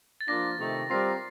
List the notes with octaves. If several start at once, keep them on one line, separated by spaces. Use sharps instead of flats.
A6
F3 A#3 D4 F4 A#6
C3 D#3 A3 D#4 G4
G3 C4 F4 A#4 D5 C7